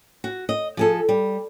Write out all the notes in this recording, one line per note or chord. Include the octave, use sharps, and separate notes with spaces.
F#4
D#5
F3 G#4 A4
G3